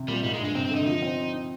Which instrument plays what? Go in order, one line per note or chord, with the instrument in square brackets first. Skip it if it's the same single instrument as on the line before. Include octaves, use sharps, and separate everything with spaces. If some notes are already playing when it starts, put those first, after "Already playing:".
Already playing: [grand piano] C3
[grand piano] A#2 [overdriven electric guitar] G3
[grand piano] G#2 [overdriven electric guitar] G3
[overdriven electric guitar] G#3
[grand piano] G2
[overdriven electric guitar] G#3
[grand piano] C3 [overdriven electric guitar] C4
[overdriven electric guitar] C4
[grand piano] D3
[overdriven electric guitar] D#4
[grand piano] F3 [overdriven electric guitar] D#4
[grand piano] C4